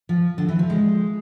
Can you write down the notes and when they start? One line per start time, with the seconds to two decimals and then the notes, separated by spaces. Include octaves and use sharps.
0.09 F3
0.38 D3
0.49 E3
0.59 F3
0.70 G#3